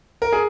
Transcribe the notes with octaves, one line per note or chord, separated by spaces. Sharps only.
A#4
G#4